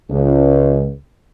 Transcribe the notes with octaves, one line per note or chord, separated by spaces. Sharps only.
C#2